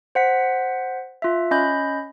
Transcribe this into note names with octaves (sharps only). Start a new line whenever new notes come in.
C5 F#5 B6
F4 E5
C#4 D#5 B5 G6